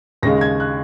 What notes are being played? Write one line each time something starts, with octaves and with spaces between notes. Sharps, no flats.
D#2 C#3 G#3 A#6
G#6
F#6